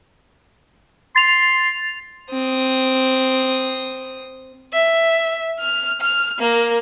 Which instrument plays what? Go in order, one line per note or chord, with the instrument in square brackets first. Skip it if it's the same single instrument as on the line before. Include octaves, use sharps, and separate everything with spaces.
[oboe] C6 [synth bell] A6 F7
[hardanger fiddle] C4 D#6
[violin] E5
F6
F6
A#3 A#4